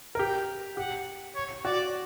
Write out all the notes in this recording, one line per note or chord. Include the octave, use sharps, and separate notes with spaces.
A#4
G4 G5
G4 F#5
C#5
F#4 D5